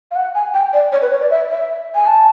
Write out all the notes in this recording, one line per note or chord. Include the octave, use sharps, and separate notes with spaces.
F5
F#5
G#5
G5
D5
C#5
B4
C#5
D5
E5
E5
G#5
A5